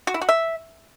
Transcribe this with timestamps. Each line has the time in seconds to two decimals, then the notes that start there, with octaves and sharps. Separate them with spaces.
0.07 F#4
0.14 E4
0.21 F#4
0.29 E5